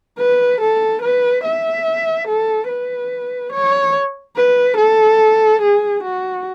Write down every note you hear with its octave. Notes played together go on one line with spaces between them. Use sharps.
B4
A4
B4
E5
A4
B4
C#5
B4
A4
G#4
F#4